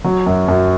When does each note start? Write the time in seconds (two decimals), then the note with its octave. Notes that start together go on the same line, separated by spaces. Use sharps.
0.04 F#3
0.26 F#2
0.48 F#2